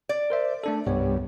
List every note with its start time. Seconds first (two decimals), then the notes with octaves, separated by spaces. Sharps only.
0.09 D5
0.30 A#4 C5 E5
0.64 A3 D4 A4
0.87 C2 G2 B3 C#5